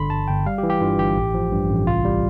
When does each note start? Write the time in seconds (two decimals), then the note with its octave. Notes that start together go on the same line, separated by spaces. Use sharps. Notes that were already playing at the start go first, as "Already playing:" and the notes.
Already playing: G1 D3 B5 C6
0.10 G2 A5
0.28 G1 G5
0.46 G3 F5
0.58 G4
0.63 E3
0.70 G4
0.82 G2 F4
0.98 G1 G4
1.17 A1
1.34 F3
1.51 G2
1.69 A1
1.86 C2 F4
2.04 G3